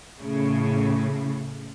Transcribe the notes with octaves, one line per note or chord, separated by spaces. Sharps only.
A2 C#3